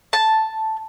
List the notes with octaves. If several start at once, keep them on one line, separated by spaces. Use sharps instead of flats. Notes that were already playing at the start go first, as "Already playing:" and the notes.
A5